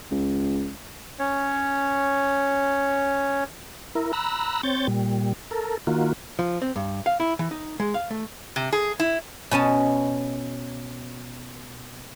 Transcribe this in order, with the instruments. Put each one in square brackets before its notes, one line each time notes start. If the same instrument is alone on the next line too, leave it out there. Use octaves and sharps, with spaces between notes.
[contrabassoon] C#2
[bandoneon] C#4 C#5
[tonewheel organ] E4 A#4
A#5 B5 E6 F#6
C4 C#5 G6 A6
A#2 G3
A4 A#4
D#3 A#3 F4 F#4
[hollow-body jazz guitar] F3
C4
G2
F5
E4
E3
D#4
G#3
F5
A3
[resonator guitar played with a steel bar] C3
G#4
E4
[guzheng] B2 C#4 D#5 A5